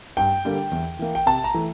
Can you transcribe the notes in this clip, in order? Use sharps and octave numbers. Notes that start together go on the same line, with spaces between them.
G2 G5
D3 G3 A#3
E2
E3 A#3
G5
C3 A5
A#5
E3 A3